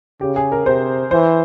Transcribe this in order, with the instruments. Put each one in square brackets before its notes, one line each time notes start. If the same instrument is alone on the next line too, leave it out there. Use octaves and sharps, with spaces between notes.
[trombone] C#3 [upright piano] G4
[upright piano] G#4
A#4
[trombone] C3 [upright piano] C5
[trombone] E3 [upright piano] C5